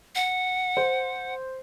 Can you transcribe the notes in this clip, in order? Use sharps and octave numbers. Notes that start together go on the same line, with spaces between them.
F#5
C5